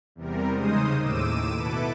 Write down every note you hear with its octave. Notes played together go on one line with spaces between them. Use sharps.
E2 C3 G3 A#4
C#3 G#3 D#4 C5 D#6
D#2 A2 D6 E6 D#7 E7
B2 E4 A4 B4 D6